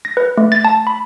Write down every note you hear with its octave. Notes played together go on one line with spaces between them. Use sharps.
A#6
B4
A3
A6
A5
B5